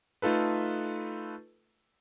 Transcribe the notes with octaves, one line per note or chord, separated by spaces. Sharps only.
A3 D#4 F4 A4 B4